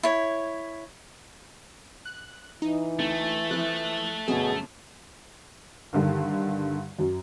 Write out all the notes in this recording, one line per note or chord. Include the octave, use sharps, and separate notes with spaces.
E4 C#5
F#6
E3 D#4
D2 A3
F3 E4 F#6
G1 F#2 B2 G#4
G2 D3 D#3
F#2 F#3